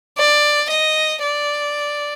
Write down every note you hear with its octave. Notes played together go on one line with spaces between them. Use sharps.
D5
D#5
D5